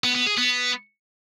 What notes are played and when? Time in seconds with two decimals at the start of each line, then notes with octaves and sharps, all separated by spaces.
0.04 B3
0.15 B3
0.26 G#4
0.38 B3